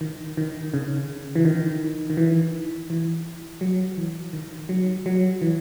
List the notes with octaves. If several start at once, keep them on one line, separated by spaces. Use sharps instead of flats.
D#3
D#3
C#3
E3
D#3
D#3
E3
E3
F#3
E3
D#3
F#3
F#3
E3